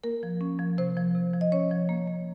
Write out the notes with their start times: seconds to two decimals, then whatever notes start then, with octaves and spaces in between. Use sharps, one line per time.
0.04 A#3 A#4
0.23 F3
0.41 C#4
0.59 F3
0.78 C3 C5
0.97 F3
1.15 C3
1.34 F3
1.41 D#5
1.52 C#4 C#5
1.71 F3
1.89 A#3
2.08 A#3